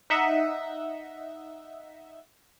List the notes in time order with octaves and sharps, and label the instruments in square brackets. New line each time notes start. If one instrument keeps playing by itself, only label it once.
[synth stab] D#4 D#5 E5 F#5